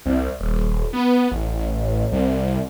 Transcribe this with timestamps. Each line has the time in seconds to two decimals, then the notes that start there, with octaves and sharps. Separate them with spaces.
0.06 C2
0.40 D#1
0.93 B3
1.31 A1
2.12 C2